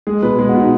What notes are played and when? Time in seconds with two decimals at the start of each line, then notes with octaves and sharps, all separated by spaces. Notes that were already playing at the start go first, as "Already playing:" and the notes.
0.07 G#3 G#4
0.22 B2 B4
0.39 G#3 G#4
0.49 F#4
0.55 B2
0.60 D#4